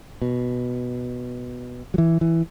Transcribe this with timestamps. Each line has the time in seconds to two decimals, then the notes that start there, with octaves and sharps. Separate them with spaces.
0.22 B2
1.94 F#3
1.98 E3
2.21 E3